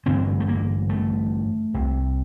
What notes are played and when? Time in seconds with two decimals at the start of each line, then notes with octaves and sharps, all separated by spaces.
0.06 A1 G2 D3 C4
0.40 A3
0.48 A#3
0.90 A3
1.74 C2 C3